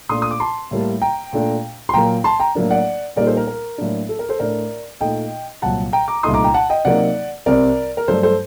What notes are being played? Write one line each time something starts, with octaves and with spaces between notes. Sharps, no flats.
A#2 A3 D4 C6 D#6
D#6
D6
A5 C6
A2 G3 A#3
G5 A#5
A#2 A3 D4
C6
A#2 F#3 A#3 G5 A#5
A5 C6
G5 A#5
A2 F#3 A#3 D4
D5 F#5
A#2 G3 A#3 D#4 A#4 D5
A4 C5
A#4
A#4
A2 F#3 A#3 D4
A4
A#4
A4 C5
A2 A3 D4 A#4 D5
A#2 A3 D#4 D#5 G5
C2 A#2 F#3 F#5 A5
G5 A#5
A#5 D6
C2 A#2 A3 D#4 C6 D#6
A#5 D6
G5 A#5
F#5 A5
D#5 G5
C3 F#3 A#3 D#4 D5 F#5
C2 C3 G3 C4 A#4 D5
A#4
G2 F#3 A3 D4 A4 C5
A4 C5